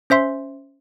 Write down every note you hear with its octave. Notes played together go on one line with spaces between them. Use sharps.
C#4 C5 E5 C6